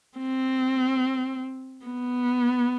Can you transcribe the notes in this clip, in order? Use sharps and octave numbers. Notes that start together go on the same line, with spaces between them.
C4
B3